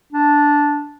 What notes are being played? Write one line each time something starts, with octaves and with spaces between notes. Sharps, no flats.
D4